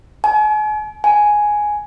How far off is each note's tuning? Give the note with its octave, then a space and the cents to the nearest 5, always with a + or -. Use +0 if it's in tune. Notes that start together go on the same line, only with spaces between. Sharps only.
G#5 +40
G#5 +5